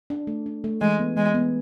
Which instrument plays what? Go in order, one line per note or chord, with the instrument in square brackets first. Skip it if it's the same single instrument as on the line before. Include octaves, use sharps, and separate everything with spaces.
[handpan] D4
A3
D4
A3
[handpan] E3 [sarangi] G#3
[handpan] B3
[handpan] E3 [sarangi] G#3
[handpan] B3